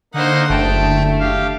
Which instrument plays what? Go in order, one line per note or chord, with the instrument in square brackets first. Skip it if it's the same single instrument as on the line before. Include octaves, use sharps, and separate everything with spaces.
[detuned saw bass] D3 [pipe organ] A#3 D#4 [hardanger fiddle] C5 F#5
[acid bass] F#1 [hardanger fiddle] A3 [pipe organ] G5 A5
[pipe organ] G4 F5